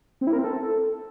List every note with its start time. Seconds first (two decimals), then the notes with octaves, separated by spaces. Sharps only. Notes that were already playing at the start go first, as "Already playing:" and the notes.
0.21 C4
0.27 E4
0.33 A#4
0.39 C4
0.44 A4